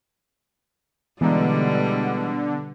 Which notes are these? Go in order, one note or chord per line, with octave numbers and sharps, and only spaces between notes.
B2 D3 E3 G3 G#3 B3 D#4